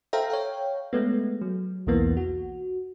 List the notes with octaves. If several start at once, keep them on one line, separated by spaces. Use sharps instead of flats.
A4 C5 E5 F5 G5 A#5
C#5 F5 G5
G#3 A3 B3
F#3
B1 E2 E3 A#3 B3
F#4